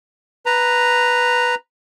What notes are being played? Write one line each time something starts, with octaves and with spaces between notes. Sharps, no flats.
B4 A#5